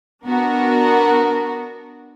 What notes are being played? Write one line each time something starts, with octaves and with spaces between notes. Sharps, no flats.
B3 D4 F#4 A#4